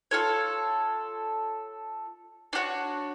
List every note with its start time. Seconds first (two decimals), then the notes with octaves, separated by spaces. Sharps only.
0.11 F4 A4 C#5
2.53 D4 F#4 C#5